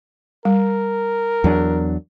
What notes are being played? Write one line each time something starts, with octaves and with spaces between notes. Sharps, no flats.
G3 A#4
E2 F#3 D4